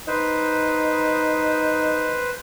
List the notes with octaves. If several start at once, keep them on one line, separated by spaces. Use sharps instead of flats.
D#4 B4 C5